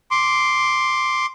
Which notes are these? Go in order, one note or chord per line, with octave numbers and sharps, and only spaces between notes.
C6 D6